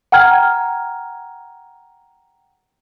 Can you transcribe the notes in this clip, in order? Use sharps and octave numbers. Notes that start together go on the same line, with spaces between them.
F#5 G5 A#5 F6 G#6